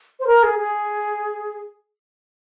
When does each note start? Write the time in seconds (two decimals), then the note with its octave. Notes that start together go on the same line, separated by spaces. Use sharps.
0.19 C5
0.26 A#4
0.43 G#4
0.58 G#4